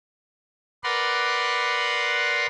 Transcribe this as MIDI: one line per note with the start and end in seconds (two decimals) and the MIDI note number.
0.84 2.47 70
0.84 2.47 71
0.84 2.47 74
0.84 2.47 78
0.84 2.47 83
0.84 2.47 84